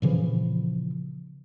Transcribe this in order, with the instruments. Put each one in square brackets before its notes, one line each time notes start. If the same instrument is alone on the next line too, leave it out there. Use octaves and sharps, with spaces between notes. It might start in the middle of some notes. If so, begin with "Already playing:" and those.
[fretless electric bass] A#2 C#3 E3 F3